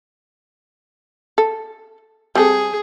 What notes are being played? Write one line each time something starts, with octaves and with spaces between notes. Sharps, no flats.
A4
G3 C4 G#4 A4